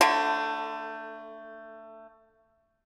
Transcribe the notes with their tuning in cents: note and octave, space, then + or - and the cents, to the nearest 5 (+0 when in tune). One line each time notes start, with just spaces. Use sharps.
D3 +0 A3 +20